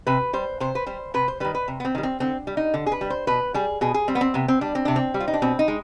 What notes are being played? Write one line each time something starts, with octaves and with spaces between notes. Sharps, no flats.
C3 B4
G3 C5
C3 C5
B4
G3 C5
C3 B4
C5
D#3 G3 B4
B4
C3
B3
C4
D#3 G3
C4
D3 C4
G3
D#4
D3
G#4
B4
G3
C5
B2 B4
G3 G#4
B2 G#4
G#4
G3 C4
B3
C4
C3 B3
C4
G3 D4
C4
C3 D4
C4
G3
F4
D#4
D4
B2 C4
D#4
G#3